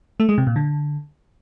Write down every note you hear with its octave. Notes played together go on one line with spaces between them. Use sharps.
A3
G#3
C3
A#2
D3